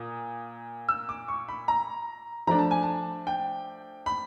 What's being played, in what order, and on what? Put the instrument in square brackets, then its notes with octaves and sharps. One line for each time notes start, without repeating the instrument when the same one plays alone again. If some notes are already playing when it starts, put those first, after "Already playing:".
Already playing: [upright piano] A#2 D#6
E6
D6
C#6
B5
A#5
F3 A3 D4 A#5
A5
G#5
A5
G5
B5